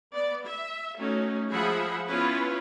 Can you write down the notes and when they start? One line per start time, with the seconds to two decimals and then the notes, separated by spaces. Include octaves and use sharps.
0.13 B3 D5
0.45 E5
0.98 A3 C#4 D#4 F#4
1.52 F3 G#3 G#4 E5 F#5 B5
2.09 B3 C#4 E4 F4 B4